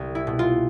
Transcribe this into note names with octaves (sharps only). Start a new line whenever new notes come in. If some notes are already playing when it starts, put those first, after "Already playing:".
Already playing: C2
E4
B2
F4